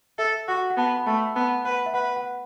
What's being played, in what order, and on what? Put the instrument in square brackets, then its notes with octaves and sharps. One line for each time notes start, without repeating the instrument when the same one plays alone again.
[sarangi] A4 [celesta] E5
[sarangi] F#4 [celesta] F#5
[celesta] F#5
[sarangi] B3 [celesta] A5
[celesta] B5
[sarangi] A3 [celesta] A5
[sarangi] B3 [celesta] A5
[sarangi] B4 [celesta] F#5
[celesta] E5
[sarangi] B4 [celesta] F#5
[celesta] F#5